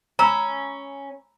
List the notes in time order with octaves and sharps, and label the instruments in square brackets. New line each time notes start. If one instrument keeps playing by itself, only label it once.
[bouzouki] C#4 [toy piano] A#5 B5 E6